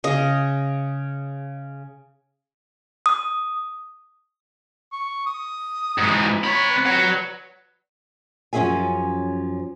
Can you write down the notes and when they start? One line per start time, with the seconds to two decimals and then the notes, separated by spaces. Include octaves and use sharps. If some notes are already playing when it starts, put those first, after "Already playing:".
0.04 C#3 G#4 D#5
3.06 D#6
4.92 C#6
5.26 D#6
5.98 G#2 E3
6.44 C4 C#5 B5
6.71 B4
6.86 C#5 F#5
8.53 F#2 F3 C#4 G#4 E5 G#5